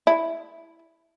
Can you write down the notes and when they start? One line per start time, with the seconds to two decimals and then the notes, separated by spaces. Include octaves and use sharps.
0.07 E4